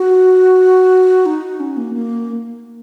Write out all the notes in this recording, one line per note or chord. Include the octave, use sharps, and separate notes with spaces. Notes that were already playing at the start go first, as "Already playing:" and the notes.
Already playing: F#4
D#4
C#4
A#3
A#3